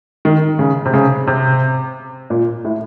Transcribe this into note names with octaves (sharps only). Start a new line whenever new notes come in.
D#3
C#3
C3
C#3
C3
A#2
A2